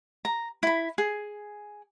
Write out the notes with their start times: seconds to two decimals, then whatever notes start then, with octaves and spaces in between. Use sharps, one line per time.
0.25 A#5
0.63 E4 B5
0.98 G#4